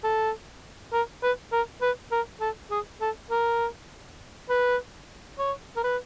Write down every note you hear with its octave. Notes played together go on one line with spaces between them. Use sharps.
A4
A#4
B4
A#4
B4
A#4
A4
G#4
A4
A#4
B4
C#5
A#4
B4